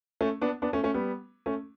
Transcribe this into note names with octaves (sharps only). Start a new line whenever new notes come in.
A3 C#4
B3 D4
B3 D4
A3 C#4
A3 C#4
G3 B3
A3 C#4